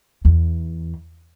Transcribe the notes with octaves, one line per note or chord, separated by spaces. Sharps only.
E2